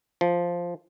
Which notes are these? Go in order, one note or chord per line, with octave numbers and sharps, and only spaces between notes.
F3